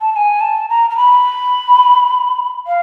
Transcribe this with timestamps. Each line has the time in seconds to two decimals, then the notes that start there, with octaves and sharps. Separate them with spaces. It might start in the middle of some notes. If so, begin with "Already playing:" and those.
0.01 A5
0.12 A5
0.16 G#5
0.41 A5
0.69 A#5
0.90 A#5
0.97 B5
2.67 F5